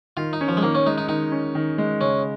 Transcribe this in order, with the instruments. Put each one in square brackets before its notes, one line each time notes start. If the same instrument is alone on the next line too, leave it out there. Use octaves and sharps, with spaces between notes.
[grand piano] D#3 [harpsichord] F4
[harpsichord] D#4
[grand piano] C#4
[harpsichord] F3
G#3
[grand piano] D#3 [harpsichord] A#3
[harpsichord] C#4
[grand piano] G#3 [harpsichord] D#4
[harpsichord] D#4
[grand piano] D#3 [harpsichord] D#4
[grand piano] C#4
D#3
G#3
[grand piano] C#3 [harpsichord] C#4